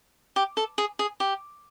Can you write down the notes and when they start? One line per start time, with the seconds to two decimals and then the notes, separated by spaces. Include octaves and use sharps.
0.36 G4
0.57 A4
0.78 G#4
0.99 G#4
1.20 G4